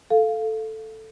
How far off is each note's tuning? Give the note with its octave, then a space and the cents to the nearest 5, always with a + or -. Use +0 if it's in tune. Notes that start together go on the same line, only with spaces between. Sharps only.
A4 +0 F5 +0